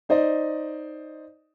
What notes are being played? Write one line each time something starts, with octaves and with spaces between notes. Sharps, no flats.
D#4 C5 D5 D#5